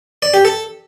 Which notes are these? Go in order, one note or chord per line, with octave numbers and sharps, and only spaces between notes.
D5
G4
A4